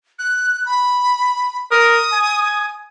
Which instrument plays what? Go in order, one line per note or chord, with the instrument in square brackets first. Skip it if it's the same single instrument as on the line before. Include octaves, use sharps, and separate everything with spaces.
[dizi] F#6
B5
[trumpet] A#4 [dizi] D#6
[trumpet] G#5